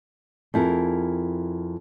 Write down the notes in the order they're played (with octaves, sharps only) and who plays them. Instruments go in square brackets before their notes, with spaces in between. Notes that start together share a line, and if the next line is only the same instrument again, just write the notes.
[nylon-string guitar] F2 E4 G#4 A#4